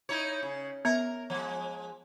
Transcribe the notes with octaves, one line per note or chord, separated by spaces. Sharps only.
D#4 E4 C#5
C#3
B3 A#4 E5
F3 G#3